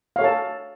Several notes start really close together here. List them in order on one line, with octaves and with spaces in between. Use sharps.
F5 C#5 A4 A5